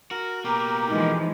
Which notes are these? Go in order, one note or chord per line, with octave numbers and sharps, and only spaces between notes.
F#4 A#4
B2 A#3 G4 A#5
E3 F3 G#3 D#4